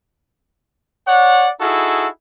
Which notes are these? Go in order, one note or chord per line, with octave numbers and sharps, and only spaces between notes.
C#5 D5 F#5
D#4 E4 F#4 G#4 A4